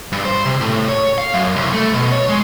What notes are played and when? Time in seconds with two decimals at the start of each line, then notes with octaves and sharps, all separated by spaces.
0.12 G2
0.25 C5
0.45 C3
0.61 A2
0.88 C#5
1.18 F5
1.34 F#2
1.56 C2
1.73 A3
1.93 B2
2.12 C#5
2.29 G#3